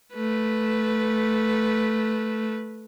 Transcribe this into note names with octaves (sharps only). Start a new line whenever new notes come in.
A3 B4